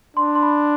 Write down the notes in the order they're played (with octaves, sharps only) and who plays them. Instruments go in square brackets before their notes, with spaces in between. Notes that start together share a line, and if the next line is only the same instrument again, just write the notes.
[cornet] D4 [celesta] C6
[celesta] C6
B5